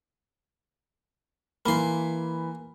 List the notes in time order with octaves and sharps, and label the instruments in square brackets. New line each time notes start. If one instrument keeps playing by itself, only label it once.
[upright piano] E3 B5 [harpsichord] A#3 C6